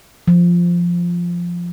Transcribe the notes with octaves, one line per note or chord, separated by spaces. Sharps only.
F3